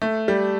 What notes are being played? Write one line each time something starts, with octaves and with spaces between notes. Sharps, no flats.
A3
G3